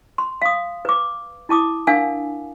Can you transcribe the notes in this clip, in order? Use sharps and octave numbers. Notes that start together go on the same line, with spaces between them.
C6
F5 D#6
B4 D6
E4 A5 D6 D#6
D4 A#4 F5 F#5 G#5